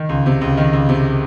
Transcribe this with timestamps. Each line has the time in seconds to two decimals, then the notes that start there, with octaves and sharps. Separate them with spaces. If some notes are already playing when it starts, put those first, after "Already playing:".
Already playing: D#3
0.09 C#2
0.26 C3
0.41 C#2
0.57 D#3
0.73 C#2
0.89 C3